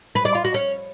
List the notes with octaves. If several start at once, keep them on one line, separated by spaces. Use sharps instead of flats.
B4
D5
F4
F#4
C#4